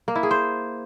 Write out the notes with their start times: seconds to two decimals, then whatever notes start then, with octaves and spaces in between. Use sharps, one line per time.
0.08 A#3
0.15 E4
0.23 G#4
0.31 C5